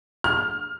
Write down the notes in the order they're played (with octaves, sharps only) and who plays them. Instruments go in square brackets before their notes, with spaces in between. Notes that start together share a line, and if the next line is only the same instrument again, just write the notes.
[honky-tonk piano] F6